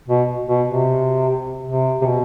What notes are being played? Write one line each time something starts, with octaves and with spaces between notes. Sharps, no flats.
B2
B2
C3
C3
C3
B2